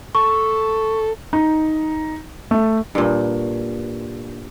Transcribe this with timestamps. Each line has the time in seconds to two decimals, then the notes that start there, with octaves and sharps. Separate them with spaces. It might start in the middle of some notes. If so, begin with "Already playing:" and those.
0.15 A4 C#6
1.33 D#4
2.51 A3
2.95 G2 A#2